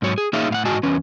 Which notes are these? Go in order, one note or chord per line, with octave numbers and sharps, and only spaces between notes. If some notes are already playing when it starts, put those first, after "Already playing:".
G#2 F#3 C#5
G#4
A#3 D#4 G#4 C#5 E5 F5
A2 F5 F#5
G#2 F#4 D#5 G#5 A5
E2 C#4 B4